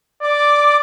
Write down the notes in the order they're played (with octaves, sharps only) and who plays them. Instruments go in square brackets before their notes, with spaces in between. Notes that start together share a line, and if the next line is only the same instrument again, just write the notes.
[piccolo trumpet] D5 [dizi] D6